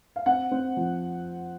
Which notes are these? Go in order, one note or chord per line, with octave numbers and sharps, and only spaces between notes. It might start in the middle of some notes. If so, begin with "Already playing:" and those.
F5
C4 F#5
C4
F3